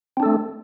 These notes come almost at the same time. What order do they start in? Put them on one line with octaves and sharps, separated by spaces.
C4 D4 A4 A3